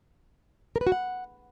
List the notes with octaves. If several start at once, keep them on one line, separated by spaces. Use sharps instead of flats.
A#4
B4
F#4
F#5